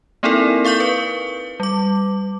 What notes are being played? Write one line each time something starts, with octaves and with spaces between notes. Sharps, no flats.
A#3 C4 D#4 E4 A4 A#4
A4 F5 C#6 G6 F#7
B4
G3 D6